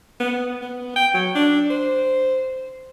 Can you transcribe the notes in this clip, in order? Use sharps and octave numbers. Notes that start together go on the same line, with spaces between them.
B3
B3
G5
F#3
D4
C5